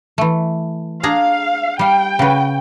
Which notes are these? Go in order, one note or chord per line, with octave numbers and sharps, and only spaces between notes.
E3 A3
D4 G#4 F5 A#5
G3 F5 G5
C#3 F#4 B4